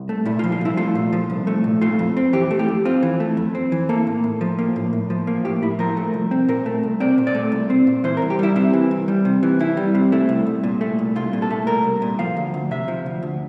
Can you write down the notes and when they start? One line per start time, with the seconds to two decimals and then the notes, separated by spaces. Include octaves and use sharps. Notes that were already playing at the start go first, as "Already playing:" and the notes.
Already playing: C2
0.09 A3
0.26 A#2 E4
0.39 F4
0.44 F3
0.52 F4
0.61 C2 E4
0.77 A3 F4
0.95 A#2
1.13 F3
1.30 C2
1.47 A3
1.64 A#2
1.81 A3 F4
1.99 F2
2.17 C4
2.33 E3 G4
2.51 A3
2.59 G4
2.68 F2
2.85 C4 F4
3.03 E3
3.20 A3
3.37 F2
3.55 C4
3.72 E3
3.89 A#3 A4
4.07 A2
4.24 A2
4.41 F3
4.59 A#3
4.76 A2
4.93 A2
5.10 F3
5.27 A#3
5.45 A2 G4
5.62 A2 E4
5.79 F3 A#4
5.97 A3
6.14 C2
6.31 C4
6.49 A#2 A#4
6.66 A3
6.83 C2
7.00 C4 D5
7.18 A#2
7.27 D5
7.35 A3
7.52 C2
7.70 C4
7.87 A#2
8.04 E3 C5
8.17 A#4
8.22 C2
8.30 G4
8.39 G3 E4
8.56 C3 E4
8.73 E3
8.91 C2
9.08 G3
9.25 C3
9.43 E3
9.59 C2 E4
9.77 G3
9.95 C3
10.12 A3 E4
10.29 C2
10.47 C2
10.63 A#2
10.81 A3
10.99 C2
11.16 C2 F4
11.33 A#2
11.42 A4
11.50 A3
11.67 C2 A#4
11.84 C2
12.02 A#2
12.19 F3 F5
12.37 D2
12.54 D2
12.71 C3 E5
12.88 F3
13.06 D2
13.23 D2